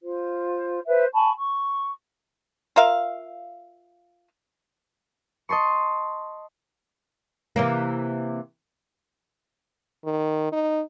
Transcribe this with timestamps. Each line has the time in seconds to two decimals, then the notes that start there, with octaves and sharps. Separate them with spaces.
0.01 F4 C5
0.87 B4 C5 E5
1.14 G#5 A5 B5 C#6
1.36 C#6
2.76 F4 A#4 E5 F5
5.49 D#5 A5 C6 C#6
7.56 C3 E3 A#3
10.05 D#3
10.52 D#4